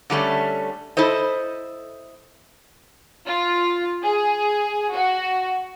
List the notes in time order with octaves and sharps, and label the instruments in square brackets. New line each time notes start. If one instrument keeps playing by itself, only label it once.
[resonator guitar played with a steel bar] D3 G3 A3 C#4
E4 A4 C5 D#5
[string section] F4
G#4
F#4